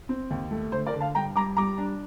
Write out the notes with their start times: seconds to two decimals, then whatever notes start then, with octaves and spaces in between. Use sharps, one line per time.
0.09 C4
0.30 D#2
0.51 A3
0.72 D3 C5
0.87 A#4 D5
0.94 D3
1.00 F5 A5
1.15 G2 G5 A#5
1.36 G2 A#5 D6
1.57 G3 A#5 D6
1.78 D4